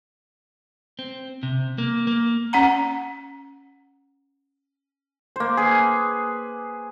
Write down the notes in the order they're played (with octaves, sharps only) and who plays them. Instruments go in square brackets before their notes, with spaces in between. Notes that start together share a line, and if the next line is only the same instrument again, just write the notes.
[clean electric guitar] C4
C3
A#3
A#3
[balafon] C#4 F#5 A#5
[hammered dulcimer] A#3 C5
G#4 B4